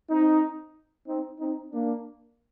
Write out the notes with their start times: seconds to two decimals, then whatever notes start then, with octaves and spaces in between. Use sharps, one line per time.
0.09 C4 D#4
1.07 C4 D#4
1.39 C4 D#4
1.72 A#3 D4